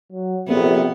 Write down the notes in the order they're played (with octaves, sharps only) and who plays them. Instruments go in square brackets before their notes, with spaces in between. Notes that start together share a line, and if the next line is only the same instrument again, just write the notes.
[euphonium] F#3
[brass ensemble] A#1 F2 [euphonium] C3 [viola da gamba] B3